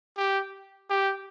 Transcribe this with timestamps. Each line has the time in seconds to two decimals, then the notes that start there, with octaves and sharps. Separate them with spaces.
0.17 G4
0.89 G4